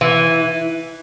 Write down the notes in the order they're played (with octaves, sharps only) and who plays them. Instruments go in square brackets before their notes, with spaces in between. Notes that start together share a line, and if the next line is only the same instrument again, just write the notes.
[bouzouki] E3